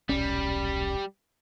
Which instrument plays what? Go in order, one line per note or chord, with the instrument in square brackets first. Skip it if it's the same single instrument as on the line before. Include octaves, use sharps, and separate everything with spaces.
[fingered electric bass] D#1 B1 C#4 [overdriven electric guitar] G3